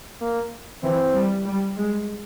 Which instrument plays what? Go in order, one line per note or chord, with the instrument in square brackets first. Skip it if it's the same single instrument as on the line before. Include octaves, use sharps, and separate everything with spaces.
[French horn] A#3
[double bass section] E3 [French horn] C4
[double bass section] G3
G3
G#3